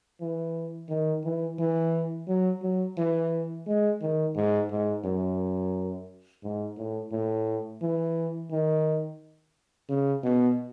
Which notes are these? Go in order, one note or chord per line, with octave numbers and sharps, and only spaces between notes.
E3
D#3
E3
E3
F#3
F#3
E3
G#3
D#3
G#2
G#2
F#2
G#2
A2
A2
E3
D#3
C#3
B2